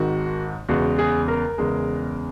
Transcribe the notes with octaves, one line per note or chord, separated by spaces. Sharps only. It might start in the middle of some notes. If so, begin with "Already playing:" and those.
Already playing: G#1 G#2 D#3 F#4
E2 C#3 G#3 F#4
G#4
A#4
E2 C#3 G#3